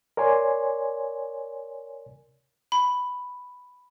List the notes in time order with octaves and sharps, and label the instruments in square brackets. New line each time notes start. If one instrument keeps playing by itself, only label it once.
[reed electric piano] A#4 C#5 D5 G#5 C6
[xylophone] B5